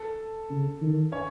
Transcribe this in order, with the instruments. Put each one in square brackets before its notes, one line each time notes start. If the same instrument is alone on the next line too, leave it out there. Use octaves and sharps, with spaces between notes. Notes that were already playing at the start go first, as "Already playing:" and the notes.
Already playing: [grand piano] A4 A5
[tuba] C#3
D#3
[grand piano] C#4 C#5